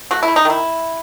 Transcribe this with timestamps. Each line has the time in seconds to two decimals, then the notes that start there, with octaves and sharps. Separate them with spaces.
0.11 A3 F#4
0.23 E4
0.28 A3
0.36 D#4
0.45 D#3 E4